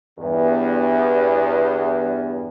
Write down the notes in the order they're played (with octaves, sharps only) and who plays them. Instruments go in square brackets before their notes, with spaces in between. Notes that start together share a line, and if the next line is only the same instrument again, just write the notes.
[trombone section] E2 G2